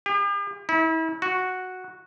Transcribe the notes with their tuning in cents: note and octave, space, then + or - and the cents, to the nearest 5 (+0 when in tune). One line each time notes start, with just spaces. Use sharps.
G4 +45
E4 -35
F#4 -5